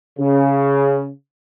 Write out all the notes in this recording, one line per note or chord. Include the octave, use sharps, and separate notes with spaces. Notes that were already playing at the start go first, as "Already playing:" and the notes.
C#3